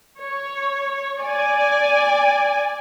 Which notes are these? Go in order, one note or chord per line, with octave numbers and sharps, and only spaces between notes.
C#5
D5 G#5